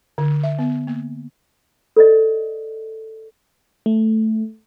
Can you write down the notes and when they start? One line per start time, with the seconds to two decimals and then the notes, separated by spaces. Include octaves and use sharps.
0.18 D3
0.43 E5
0.59 B3
0.87 A#3
1.96 A4 D5 D#5
3.86 A3